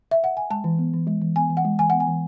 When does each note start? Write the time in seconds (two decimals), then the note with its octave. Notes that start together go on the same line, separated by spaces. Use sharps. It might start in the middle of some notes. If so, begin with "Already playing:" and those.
0.11 E5
0.24 F#5
0.37 G#5
0.50 G#3 A5
0.64 E3
0.79 B3
0.94 E3
1.07 G#3
1.21 E3
1.36 B3 G#5
1.50 E3
1.57 F#5
1.65 G#3
1.79 E3 G#5
1.90 B3 F#5
2.00 G#5
2.07 E3